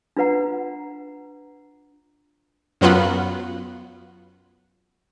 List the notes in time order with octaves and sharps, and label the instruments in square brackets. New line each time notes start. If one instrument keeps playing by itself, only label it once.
[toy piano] D4 F4 B4 F#5 A#5
[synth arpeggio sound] F#2 F#3 B3 F4 F#5 B5